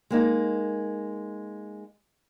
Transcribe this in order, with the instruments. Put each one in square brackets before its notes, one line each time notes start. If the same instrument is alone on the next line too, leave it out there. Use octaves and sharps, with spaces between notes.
[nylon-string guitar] G#3 A#3 D#4